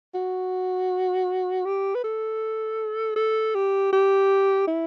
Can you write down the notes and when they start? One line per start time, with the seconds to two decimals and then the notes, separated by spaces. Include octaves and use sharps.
0.14 F#4
1.65 G4
1.95 B4
2.04 A4
3.16 A4
3.55 G4
3.93 G4
4.67 E4